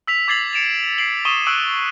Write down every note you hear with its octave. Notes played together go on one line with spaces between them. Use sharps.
E6 B6 F7
D6 G#6 A6 C7 F7 F#7
C#7 D7 E7 F7
C7 D7 F#7
C#6 D#6 D#7 E7 G7
C#6 E6 F#6 D7 F#7